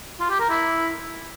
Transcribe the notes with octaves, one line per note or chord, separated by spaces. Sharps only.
F4
G4
A#4
E4